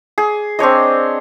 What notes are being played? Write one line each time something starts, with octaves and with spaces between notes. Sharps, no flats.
G#4
C4 D4 C#5 D#5